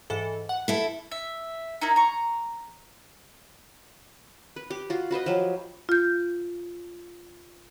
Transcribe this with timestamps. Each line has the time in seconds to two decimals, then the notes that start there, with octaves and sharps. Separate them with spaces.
0.10 G#2 E3 A4
0.49 F#5
0.68 E4 A4
1.11 E5
1.81 D#4 E4 A#4
1.96 A#5 C#6
4.56 B4
4.70 G4
4.90 F4 F#4
5.11 F#4 B4 C5 D#5
5.26 F3 F#3 G4
5.89 F4 G6